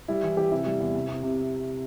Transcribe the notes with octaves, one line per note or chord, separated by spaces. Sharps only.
G3 E4
E3
E3 G4
C3 E4
G3
E2
C3
C3
C3